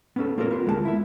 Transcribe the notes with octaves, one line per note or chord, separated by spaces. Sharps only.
B3 C#4 A4
A#3 F4 G4 A4 A#4
B3 F4
D2 G#3 A#4 F#5 A5
E4 E5